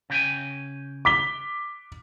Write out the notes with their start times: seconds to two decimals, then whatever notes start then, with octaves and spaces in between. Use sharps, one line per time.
0.10 C#3 G5 G#5
1.05 D6 B6 G7